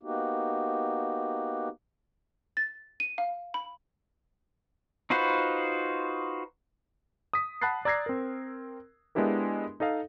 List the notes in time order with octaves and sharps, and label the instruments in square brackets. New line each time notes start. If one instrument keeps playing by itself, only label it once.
[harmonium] A#3 B3 D#4 F#4 G4
[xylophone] A6
D#7
F5
B5
[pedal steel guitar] D#4 F4 F#4 B4 C5
[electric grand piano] D#6 B6
F#5 A5 B5 F#6 A6 C7
D5 A#5 E6 G#6 A#6 C7
C4 A#4
G#3 B3 D4 E4 G4 A#4
D#4 A4 D#5 F5